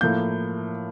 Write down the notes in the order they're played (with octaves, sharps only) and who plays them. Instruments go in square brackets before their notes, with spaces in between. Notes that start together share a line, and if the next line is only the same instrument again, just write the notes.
[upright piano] A2 F3 A#3 G6